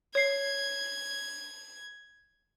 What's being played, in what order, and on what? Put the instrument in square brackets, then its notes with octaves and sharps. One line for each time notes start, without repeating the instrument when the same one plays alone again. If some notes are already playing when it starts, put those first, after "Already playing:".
[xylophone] C#5 C7 [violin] G#6